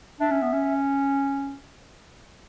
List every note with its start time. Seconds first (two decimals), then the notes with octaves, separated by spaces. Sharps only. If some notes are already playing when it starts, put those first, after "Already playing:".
0.20 D4 E5
0.31 C#4
0.42 B3
0.52 C#4